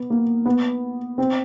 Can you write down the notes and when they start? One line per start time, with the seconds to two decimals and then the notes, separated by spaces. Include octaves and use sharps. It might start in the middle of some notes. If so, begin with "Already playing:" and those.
Already playing: B3
0.10 A#3
0.46 B3
1.18 C4